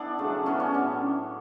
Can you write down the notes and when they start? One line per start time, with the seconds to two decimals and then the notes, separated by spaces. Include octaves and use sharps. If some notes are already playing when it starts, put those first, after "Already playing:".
Already playing: B3 D4 E4 A4
0.19 C#3 F#3 A3
0.46 C#3 E3 B3 C#4
0.60 C#4
0.74 A2 F#3 B3 D4